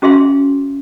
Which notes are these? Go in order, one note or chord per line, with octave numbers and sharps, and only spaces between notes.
C#4 F#4 G#4 E5 F5 C6